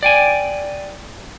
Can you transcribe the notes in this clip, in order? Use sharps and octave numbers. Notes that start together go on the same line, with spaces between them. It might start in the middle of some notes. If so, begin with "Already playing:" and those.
D5 G5 G#5